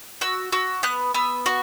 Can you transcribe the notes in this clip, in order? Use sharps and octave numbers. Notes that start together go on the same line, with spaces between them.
F#4 E6
F#4 E6
B3 F#6
B3 E6
F#4 C#6